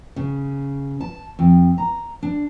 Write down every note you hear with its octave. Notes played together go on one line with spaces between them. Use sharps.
C#3
A5
F2
A#5
D4